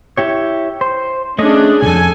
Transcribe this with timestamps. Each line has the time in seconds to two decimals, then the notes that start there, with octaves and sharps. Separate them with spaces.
0.17 E4 G4 C#5
0.81 C5
1.39 A3 C#4 D4 G#4 D#5
1.82 C2 F2 A4 G#5